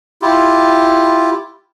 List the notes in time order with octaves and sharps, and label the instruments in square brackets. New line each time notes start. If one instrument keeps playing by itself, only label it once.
[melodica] E4 F4 G4